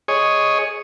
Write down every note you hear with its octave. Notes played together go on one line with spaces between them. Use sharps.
G#4 C#5 D#5